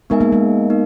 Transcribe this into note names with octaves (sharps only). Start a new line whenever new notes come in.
G#3 B3 D#4 A#4 E5 G#5
A#3
G#3
B3 D#4 A#4